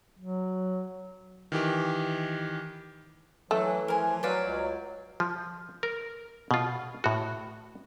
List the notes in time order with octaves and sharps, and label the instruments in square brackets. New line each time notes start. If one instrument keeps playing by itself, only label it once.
[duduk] F#3
[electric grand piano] D#3 E3 G4
[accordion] E3 [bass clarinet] F#3 [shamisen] A3
[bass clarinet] F3 [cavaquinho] A#4 G#5
[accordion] F#3 [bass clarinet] B4 [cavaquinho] C5 D5 F5
[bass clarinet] C#2
[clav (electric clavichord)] F3
A#4
B2 F4
A2 F#4